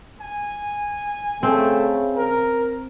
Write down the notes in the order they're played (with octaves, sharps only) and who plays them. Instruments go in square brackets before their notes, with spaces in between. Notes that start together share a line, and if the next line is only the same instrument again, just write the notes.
[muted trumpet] G#5
[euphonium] C#3 [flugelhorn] A3 [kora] C4
[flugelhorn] A#4